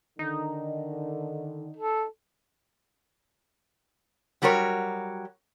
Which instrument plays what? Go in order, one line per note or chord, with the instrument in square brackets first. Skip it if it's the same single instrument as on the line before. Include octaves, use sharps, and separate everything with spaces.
[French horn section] D3 D#3 [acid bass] D#4
[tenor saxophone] A4
[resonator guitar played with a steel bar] F#3 G3 F#4 A#4 C#5